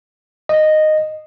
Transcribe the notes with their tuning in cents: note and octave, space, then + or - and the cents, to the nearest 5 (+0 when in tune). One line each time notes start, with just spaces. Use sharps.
D#5 -10